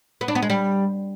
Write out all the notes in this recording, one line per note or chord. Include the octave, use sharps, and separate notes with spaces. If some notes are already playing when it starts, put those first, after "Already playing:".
B3
D4
B3
G#3
G3